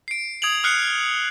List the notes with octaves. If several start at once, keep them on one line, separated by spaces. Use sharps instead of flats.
C7 D7
D#6 G#6 D7 F7 F#7
D#6 F6 F#6 C7 C#7